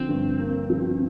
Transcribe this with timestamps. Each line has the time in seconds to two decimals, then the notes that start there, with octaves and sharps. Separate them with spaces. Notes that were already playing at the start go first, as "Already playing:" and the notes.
Already playing: D3 F3 C4
0.09 G2
0.39 A#3
0.70 F3